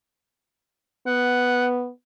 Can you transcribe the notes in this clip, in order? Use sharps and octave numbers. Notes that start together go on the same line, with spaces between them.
B3 F#5